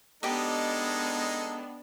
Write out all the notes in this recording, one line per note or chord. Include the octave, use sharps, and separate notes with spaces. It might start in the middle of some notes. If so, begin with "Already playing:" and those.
G#3 B3 D4 D#4 G4 A4 D#5